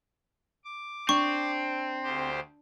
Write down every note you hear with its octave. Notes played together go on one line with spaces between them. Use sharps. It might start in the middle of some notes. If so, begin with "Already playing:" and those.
D6
C4 D4 C#6
D2 G4 C5